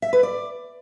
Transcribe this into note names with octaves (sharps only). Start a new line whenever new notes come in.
E5
B4
D5